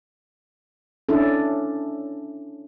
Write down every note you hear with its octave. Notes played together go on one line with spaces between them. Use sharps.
C#4 D4 E4 A4